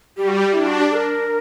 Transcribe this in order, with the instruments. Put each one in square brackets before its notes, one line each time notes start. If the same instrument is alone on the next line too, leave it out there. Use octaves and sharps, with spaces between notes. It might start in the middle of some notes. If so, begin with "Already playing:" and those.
[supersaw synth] G3 [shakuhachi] G4
[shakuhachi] F#4
G4
[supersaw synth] D4 [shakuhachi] E4
[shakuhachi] F#4
G4
A#4